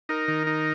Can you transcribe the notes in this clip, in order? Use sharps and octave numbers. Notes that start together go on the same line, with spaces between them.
D#4 A#4
D#3
D#4